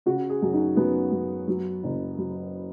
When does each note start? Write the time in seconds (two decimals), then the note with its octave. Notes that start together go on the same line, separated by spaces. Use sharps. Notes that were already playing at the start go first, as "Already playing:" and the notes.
0.06 C#3 F#4
0.30 G#4
0.42 F#2
0.53 D#4
0.76 F#2 B3
1.12 F#2
1.48 F#3
1.83 F#1
2.18 F#2